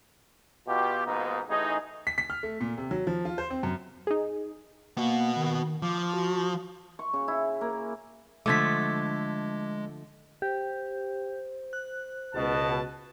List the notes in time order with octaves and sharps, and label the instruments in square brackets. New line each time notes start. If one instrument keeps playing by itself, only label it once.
[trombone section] B2 F4 G4
G#2 B2 F3 A#3 B3 D#4
A1 D#4 G#4
[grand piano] B6
B6
F6
A3
A#2
C3
F#3
F3
F4
C5
C4
F#2
[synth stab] D#4 G#4
[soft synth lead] A#3 [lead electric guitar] B3 F#4
[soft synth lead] D#3
[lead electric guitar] F3 [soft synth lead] D6
[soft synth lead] F#4
[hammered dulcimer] C#6
C#3
E4
A#3
[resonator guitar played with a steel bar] D3 F3 A3 [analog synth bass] G#3 [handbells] D6 G#6 B6
[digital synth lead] G4 [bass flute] C5
[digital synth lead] F#6
[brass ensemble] C#2 B2 A5